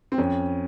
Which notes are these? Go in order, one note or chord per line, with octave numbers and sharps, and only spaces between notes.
C4
F2 C#4